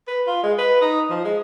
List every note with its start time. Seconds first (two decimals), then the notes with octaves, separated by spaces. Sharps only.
0.07 B4
0.27 F4
0.43 G#3
0.58 B4
0.81 D#4
1.10 F3
1.24 G#3